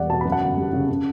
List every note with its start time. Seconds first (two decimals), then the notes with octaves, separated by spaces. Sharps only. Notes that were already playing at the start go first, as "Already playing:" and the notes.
Already playing: E1 E2 G3 D5 F#5
0.10 B2 A5
0.21 F#2 B5
0.32 F#5 A5
0.42 G1
0.58 G3
0.73 C#3
0.89 C#3